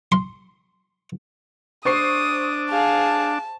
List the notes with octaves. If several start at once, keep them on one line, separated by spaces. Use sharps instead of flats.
C6
D4 C5 C#6 D#6 C7
G#4 F5 A5